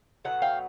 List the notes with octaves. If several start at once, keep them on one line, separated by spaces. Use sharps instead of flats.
B2 F#3 A3 F#5
F5 G5